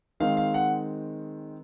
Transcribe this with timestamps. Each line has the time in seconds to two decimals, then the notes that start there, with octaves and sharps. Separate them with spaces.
0.20 D#3 G#3 C4 F5
0.37 F5
0.54 F#5